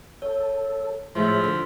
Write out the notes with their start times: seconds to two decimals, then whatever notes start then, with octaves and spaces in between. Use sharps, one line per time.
0.22 A4 C#5
1.15 A2 F3 G#3 G#4 E5 C6 B6
1.44 D3